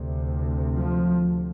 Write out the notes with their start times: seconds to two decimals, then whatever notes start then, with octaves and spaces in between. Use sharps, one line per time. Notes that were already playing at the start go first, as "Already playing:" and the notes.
Already playing: D2 C3
0.76 F3